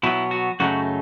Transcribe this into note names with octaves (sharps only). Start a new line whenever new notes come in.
B2 F#3 B3 E4
F#4
F#2 C#3 F#3 A3 D#4 F#4